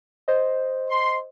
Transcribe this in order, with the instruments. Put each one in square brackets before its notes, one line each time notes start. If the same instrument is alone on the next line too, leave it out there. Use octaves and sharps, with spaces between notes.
[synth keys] C5 D#5
[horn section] C6